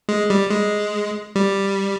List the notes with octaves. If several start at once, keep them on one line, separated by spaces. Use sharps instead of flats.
G#3
G3
G#3
G3